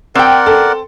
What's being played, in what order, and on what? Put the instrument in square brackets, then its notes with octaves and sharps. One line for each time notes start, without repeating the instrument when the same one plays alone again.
[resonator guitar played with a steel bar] C4 G5 [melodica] A#4 D5 F#5
[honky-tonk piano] A4